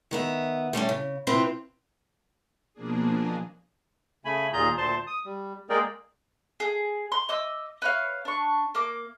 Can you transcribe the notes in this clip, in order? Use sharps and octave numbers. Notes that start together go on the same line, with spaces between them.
D#3 B3 E5
G3 A3 C4 C#4
C#3
C3 C4 E4 F4 B4
B2 F3 A#3 D4 G#4
C#3 A3 G#5 B5
D#2 A#2 F4 G#4 A#5 G6
D2 A#2 C5 A5 C6
D#6
G3
G#3 A#3 G#4 A#4 D5 G5
G#4
C6
D#5 D6 E6
B4 C#5 F5
D4 C#6
A#3 D6